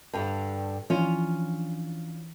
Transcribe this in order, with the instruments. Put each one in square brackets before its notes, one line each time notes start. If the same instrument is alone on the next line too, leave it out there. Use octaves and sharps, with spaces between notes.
[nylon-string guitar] G2 D3
[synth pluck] E3 F3 D4 [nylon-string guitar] C#4 F4